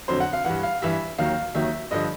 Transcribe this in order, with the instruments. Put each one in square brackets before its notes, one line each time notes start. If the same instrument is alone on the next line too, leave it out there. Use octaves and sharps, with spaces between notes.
[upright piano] F2 D3 F#3 C5
F#5
F5
G2 E3 F#5
F5
G2 E3 E5
D#2 D#3 F#3 F5
D#2 D#3 F#3 E5
G2 D3 F3 D#5